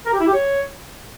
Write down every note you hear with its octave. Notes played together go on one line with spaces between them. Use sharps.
A#4
G4
E4
G4
C#5